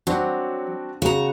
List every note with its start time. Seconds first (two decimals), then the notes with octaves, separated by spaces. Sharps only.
0.07 F#3 C4 D4 F#4
1.02 C#3 F#4 A#5